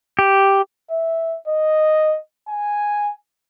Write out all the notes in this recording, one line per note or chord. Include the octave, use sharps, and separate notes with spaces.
G4
E5
D#5
G#5